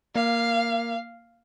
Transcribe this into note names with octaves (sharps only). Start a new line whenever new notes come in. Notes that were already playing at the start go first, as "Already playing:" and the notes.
A#3 F5